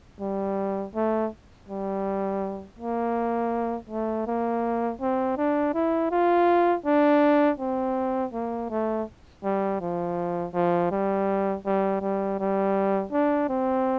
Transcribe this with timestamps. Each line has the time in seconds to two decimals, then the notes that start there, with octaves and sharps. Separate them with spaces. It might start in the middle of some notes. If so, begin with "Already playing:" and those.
0.21 G3
0.95 A3
1.69 G3
2.79 A#3
3.89 A3
4.27 A#3
5.01 C4
5.37 D4
5.74 E4
6.11 F4
6.85 D4
7.60 C4
8.33 A#3
8.70 A3
9.43 G3
9.81 F3
10.54 F3
10.91 G3
11.65 G3
12.02 G3
12.39 G3
13.12 D4
13.49 C4